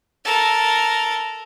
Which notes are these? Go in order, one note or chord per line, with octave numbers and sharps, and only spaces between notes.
A4 A#4